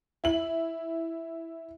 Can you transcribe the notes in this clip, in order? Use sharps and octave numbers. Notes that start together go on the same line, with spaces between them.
E4 F#7